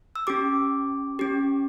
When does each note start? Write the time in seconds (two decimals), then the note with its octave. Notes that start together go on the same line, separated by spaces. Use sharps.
0.16 E6
0.27 C#4 G4 D6
1.19 C#4 G4